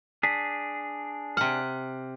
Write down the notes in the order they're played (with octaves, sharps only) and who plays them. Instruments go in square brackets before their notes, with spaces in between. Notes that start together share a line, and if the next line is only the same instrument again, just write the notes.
[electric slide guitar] D4 G#4 [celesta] B6
[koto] C3 F#5 [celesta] F6